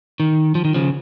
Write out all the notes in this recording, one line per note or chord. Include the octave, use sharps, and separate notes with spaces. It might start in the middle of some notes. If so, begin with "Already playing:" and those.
D#3
F3
D#3
C#3 F3